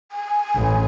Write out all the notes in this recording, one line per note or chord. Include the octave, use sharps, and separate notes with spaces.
G#5
A1